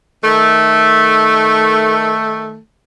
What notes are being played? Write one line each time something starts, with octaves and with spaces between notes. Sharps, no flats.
D#3 A3